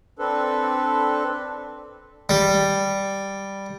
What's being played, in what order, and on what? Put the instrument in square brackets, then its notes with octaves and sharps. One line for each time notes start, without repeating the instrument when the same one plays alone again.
[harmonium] C4 D4 A4 B4
[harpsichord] G3